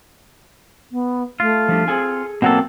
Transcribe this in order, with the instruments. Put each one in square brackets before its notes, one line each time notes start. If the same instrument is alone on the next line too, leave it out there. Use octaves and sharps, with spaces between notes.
[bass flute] B3
[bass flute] A3 [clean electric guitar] F4
[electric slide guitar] F3 G3 D4
[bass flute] C4 [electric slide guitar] G#4 A4 G#5
[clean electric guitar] B2 F#3 A4 [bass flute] A#3 [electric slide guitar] C4 F#5